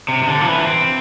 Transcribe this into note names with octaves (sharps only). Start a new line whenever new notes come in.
C3
C3
D3
F3
E3
B3
C4